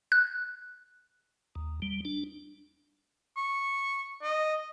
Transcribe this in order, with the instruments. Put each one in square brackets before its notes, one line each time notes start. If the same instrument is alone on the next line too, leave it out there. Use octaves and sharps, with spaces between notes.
[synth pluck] F#6
[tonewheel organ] D#2
G3
D4
[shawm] C#6
D#5